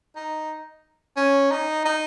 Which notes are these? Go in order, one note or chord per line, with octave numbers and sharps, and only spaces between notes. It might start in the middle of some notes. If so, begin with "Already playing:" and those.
D#4
C#4
D#4
D#4